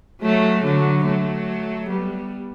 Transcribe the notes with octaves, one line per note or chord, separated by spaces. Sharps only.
F#3 A3
D3 F#3
F#3 A3
G3 B3